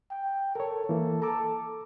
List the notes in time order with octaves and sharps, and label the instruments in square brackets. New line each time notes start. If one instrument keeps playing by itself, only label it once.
[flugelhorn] G5
[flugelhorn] A4 [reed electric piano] A#4 C#5
[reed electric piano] E3 A#3
[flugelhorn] A4 [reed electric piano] A#5 D6